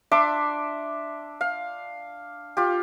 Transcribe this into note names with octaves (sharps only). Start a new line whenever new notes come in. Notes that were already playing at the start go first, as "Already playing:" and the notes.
D4 E5 C6 D6
F5
F4 G4